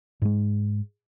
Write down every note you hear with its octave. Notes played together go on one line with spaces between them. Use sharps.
G#2 G#3